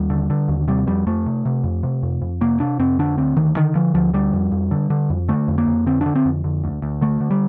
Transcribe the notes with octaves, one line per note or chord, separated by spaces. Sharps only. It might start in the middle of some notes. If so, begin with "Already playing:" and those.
Already playing: D#2 G3
D3
D3
D#2
C3 G3
F2 G3
F2 A3
C3
C3
F2
C3
F2
F2
C3 A#3
C3 D4
F2 C4
D3 D4
D2 C4
D2 D#3
D3 D#3
D3 F3
D2 F3
D3 G3
F2
F2
D3
D3
F2
D3 A3
F2
A#3
F2
D3 C4
D3 D4
C4
F2
D3
D2
D2
D3 A3
D3
G3